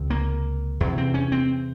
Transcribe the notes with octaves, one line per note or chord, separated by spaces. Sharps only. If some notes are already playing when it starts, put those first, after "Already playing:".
Already playing: C#2 C3
A#3
E2 C3
C4
C#4
C4